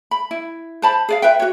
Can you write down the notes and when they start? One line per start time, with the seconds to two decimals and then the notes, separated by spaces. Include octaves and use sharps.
0.11 B5
0.31 E4
0.82 C5 A5 B5
1.09 G#4 D5 F5
1.22 F4 B4 E5 G5
1.39 F#4 C#5